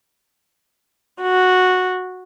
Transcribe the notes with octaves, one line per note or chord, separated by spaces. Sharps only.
F#4